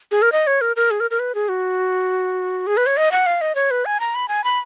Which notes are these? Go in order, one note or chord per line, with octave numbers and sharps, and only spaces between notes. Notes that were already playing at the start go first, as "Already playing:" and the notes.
G#4
A#4
D#5
C#5
A#4
A#4
G#4
A#4
A#4
B4
G#4
F#4
G#4
B4
C#5
D#5
F#5
F5
D#5
C#5
B4
G#5
A#5
B5
G#5
B5